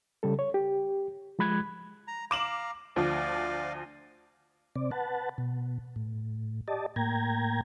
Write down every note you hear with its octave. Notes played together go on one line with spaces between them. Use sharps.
C#3 G3 A4
C#5
G4
F3 G#3 B5 F#6 G#6
A#5
F5 A#5 D6 E7 F#7
D2 F3 D5 F5
C3 C4 D5
B4 F#5 A5
B2
A2
G4 D5 D#5 A5
A2 A#3 G5 A#5 G#6